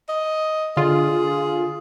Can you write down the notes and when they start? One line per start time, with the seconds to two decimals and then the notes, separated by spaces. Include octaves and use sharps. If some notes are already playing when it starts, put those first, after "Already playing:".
0.09 D#5
0.77 D3 F4 G#4